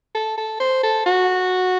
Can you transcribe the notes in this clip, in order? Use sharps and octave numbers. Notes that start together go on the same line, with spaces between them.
A4
A4
C5
A4
F#4